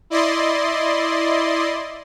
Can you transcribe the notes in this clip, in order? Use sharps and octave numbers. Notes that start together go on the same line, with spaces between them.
E4 D5 D#5 C6